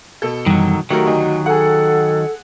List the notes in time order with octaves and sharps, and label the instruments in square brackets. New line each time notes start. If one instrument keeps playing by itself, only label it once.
[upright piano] B2 A4
[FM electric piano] F#2 E3 G3 [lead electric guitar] D#3 F#3
[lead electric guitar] D#3 F#3 [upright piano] A3 A#4 [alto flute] F#4 [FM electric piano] G4
[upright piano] D2 D#4
[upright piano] G#4 F#5 [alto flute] A4